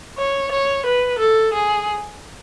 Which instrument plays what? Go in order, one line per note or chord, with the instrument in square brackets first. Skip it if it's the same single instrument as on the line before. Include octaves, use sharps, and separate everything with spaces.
[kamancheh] C#5
C#5
B4
A4
G#4